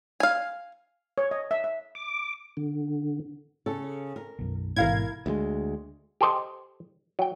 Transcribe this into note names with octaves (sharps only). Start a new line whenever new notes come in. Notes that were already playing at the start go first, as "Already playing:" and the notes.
F5 G#5
C#5
D#5
E5
E5
D6
D3
C#3 A4
A#4
B1 F#2
A1 G#2 B2 E4 A#4 F5 G#6
D2 G3 G#3
G4 A4 C5 D#5
F#3 G5